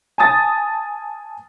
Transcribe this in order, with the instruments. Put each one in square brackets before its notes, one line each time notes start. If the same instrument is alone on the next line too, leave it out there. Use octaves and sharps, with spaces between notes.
[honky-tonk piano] G#5 A5 D#6 A6